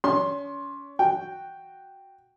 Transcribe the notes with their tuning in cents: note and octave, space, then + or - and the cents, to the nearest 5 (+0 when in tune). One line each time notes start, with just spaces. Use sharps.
C#4 +35 C6 +15
F#4 +0 G5 +0